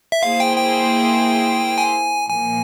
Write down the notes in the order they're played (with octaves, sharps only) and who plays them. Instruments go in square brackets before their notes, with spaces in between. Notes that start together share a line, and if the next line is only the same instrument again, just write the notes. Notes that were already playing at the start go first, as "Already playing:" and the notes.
[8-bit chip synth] E5
[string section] A#3 E4 G#4 C5 [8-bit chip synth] F5
[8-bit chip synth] G5
G5
G#5
[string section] A#2 F3 A#3 [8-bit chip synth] G#5